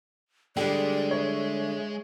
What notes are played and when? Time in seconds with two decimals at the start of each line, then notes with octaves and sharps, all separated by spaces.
0.57 D3 G3 G#3 G4 D5
1.11 C#5 E5